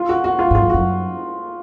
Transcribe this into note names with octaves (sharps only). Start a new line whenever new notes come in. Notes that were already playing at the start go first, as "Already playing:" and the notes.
Already playing: F4
F#4
F#4
F4
G#2
F4
F2
F#2 F#4